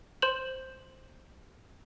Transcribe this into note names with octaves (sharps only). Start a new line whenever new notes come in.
C5 C6 G6 E7 F#7